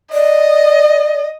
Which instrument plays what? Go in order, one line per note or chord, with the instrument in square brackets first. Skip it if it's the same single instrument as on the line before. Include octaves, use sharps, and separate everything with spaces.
[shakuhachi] D5 [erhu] D#5